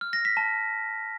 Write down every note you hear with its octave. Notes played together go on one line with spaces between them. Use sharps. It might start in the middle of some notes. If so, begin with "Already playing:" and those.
F6
A#6
B6
A5